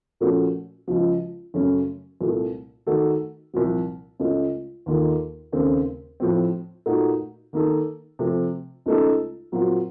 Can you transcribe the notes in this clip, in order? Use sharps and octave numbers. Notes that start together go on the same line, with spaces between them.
A#2 F3 A3 C#4 F#4
C#2 C#3 F3
F#2 C#3 A3 C#4
C2 A#2 A3
D#3 A3 D#4 F#4 A4
C2 A#2 F3
C#2 C#3 A3 C#4
D#2 D#3 A#3 F4 A4
D#2 C#3 A3 C4
A2 F3 C4
A#2 A3 D#4 F#4
D#3 A#3 D#4 A4
C3 F3 A3
C#2 C#3 A3 D#4 A4
A#2 F#3 C4 F4